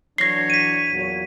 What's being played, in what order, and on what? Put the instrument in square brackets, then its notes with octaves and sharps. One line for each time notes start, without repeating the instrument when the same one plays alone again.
[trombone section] E3 F#3 D4 [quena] C#5 [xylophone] A#6 C7
[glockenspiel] B6 D#7
[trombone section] E2 A#2 F#3